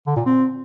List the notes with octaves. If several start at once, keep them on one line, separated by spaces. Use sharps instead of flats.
D3
A#2
C4